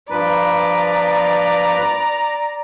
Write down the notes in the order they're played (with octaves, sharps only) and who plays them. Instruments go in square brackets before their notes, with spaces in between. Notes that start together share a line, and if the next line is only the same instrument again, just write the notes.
[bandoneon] G2 F3 B4 [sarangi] D5 [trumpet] A#5